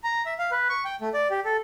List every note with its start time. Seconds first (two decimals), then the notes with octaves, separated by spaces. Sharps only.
0.04 A#5
0.26 E5
0.39 F5
0.51 B4
0.69 C#6
0.85 G5
1.01 A3
1.14 D5
1.30 G4
1.45 A4